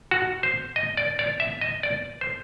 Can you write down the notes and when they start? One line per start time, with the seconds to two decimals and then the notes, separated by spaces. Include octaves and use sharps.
0.11 F#4
0.43 C5
0.76 D#5
0.97 D5
1.19 D5
1.40 E5
1.61 D#5
1.83 D5
2.21 C5